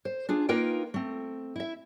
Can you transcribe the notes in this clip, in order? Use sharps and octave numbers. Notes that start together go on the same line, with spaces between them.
C5
D4 F4 G#4
A#3 D#4 F4 A#4 B4 G5
A3 C4
E4 E5